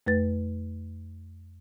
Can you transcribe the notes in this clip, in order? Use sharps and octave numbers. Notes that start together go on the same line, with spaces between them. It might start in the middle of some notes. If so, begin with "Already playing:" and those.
F2 A3 B4 A6